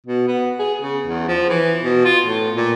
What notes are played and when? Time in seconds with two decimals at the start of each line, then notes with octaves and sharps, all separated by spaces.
0.06 B2
0.27 B3
0.59 G#4
0.82 C#3
1.06 E2
1.28 F3
1.49 E3
1.84 B2
2.05 F4
2.25 A2
2.56 A#2